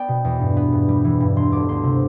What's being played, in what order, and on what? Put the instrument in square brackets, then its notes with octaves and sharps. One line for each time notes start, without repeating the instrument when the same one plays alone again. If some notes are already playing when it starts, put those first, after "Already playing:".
Already playing: [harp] B3 D5 G5
B2
E2
G2
B3
G2
G3
E3
G2
E1 C6
D2 D6
D2 C6
C3